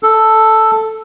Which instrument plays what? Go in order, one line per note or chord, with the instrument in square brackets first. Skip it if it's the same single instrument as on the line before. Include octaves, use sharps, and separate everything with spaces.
[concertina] A4